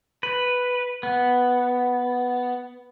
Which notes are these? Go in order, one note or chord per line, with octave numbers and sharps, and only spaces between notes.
B4
B3